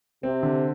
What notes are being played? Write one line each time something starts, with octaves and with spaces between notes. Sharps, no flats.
C3 C4
D3